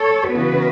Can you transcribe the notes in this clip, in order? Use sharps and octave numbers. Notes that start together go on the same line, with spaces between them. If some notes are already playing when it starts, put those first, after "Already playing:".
Already playing: A4 C#5
C#3 E3 B3 F#4 B4